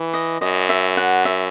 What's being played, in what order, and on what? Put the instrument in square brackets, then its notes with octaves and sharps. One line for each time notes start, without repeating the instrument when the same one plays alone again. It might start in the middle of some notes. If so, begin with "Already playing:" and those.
Already playing: [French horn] E3
[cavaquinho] D#5
[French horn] F#2 [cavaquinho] D#5
[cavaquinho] E5
F#5
E5